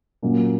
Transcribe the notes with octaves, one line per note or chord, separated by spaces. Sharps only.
A#2 F#3 A#3 C#4